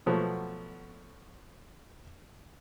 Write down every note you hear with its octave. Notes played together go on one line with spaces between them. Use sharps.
B2 F3 F#3 A3 B3